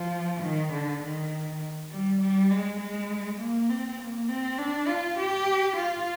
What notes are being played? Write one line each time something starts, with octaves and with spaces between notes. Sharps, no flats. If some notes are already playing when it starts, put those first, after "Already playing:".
Already playing: F3
D#3
D3
D#3
G3
G3
G#3
G#3
A#3
C4
A#3
C4
D4
F4
G4
F4